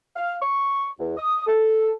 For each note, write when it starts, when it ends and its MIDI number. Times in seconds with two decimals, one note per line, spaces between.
0.16 0.36 77
0.42 0.88 85
0.99 1.13 40
1.17 1.45 87
1.47 1.90 69